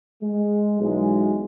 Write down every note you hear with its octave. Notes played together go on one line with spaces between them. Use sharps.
G#3
B1 E3 F#3 G#3